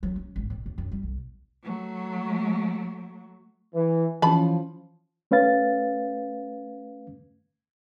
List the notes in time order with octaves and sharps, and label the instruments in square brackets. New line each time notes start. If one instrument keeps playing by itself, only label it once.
[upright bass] F#3
C#4
G#1
A#2
D#2
F#2
G3
B1
[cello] F#3 A3
[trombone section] E3
[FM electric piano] E3 C#4 [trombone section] F3 [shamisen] A5 B5
[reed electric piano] A3 C#4 B4 F5 A6